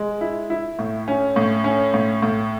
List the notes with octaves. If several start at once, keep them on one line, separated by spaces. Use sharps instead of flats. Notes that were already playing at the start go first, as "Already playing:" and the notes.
Already playing: G#3
E4
E4
A2
C#4
A2
C#4
A2
A2